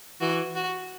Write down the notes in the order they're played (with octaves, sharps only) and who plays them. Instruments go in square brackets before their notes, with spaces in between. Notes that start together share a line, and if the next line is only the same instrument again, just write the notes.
[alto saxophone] E3 [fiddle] F#4
[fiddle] F#4